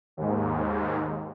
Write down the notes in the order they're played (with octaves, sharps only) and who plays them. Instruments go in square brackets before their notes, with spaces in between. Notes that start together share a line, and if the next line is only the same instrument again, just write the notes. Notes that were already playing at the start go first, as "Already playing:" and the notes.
[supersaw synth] D#2 G#2